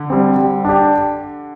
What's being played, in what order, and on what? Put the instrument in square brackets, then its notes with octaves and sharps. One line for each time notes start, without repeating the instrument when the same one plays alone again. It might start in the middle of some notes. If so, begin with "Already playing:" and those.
Already playing: [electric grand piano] D3
[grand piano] G3 C4
G3
D4 G4